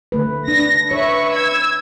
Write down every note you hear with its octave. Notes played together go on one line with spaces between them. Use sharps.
D3 A3 B4
D4 A#6
B4 C#5 E5 C#6
E6 G#6